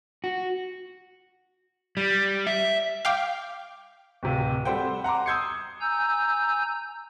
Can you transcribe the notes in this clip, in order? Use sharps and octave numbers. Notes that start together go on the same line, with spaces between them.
F#4
G3
E5
F5 G5 D6
D1 C3 F5
G3 C4 A4 C5 F#5 G5
F#5 A#5 C6 D6
D#6 E6 G6 G#6 C7 C#7
G#5 A#5 E6 G6